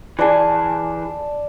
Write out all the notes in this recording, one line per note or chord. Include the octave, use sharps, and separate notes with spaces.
E3 G#4 D5 A5